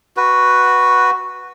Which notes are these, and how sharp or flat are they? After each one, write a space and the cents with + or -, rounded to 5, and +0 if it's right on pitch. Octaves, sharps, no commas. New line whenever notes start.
F#4 +0 B4 +0